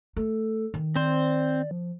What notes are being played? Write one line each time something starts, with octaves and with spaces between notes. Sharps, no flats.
A3 A4
D#3
C4 C5 D5
F3